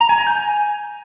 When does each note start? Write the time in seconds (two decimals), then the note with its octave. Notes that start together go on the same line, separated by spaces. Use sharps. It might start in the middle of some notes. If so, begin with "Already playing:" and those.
0.01 A#5
0.09 G#5
0.18 A#5
0.27 G6
0.35 G#5